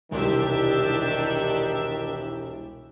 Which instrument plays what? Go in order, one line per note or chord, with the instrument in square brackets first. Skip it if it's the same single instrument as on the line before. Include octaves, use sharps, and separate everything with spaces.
[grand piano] E1 C2 C6 [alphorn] D#3 [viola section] D4 G4 E5